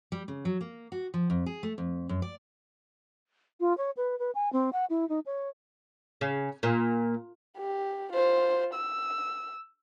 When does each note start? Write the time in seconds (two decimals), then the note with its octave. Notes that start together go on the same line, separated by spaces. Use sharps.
0.12 G3
0.28 C#3
0.45 F#3
0.61 A#3
0.92 F#4
1.14 F3
1.30 F2
1.46 G#4
1.63 A3
1.78 F2
2.09 F#2
2.22 D5
3.60 F4
3.77 C#5
3.97 B4
4.19 B4
4.35 G#5
4.52 C4
4.73 F#5
4.90 E4
5.09 D#4
5.26 C#5
6.21 C#3
6.63 A#2
7.58 G4
8.13 F4 C5
8.74 E6